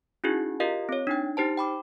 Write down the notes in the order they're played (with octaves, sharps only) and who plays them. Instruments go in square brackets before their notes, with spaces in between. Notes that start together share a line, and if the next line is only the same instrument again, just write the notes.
[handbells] C#4 D#4 E4 F#4 G#4
F4 G4 A#4 D#5 F5
C4 C#5
D4 D#4 G5
D#4 G4 C5 A5
G5 B5 D6